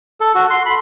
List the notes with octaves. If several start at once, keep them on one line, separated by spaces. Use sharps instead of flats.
A4
F#4
C6
B5